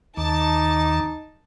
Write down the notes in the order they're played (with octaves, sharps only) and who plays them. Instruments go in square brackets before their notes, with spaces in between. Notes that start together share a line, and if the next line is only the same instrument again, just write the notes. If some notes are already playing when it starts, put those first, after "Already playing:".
[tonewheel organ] D#2 D#3 D6 [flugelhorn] D#4 [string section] A5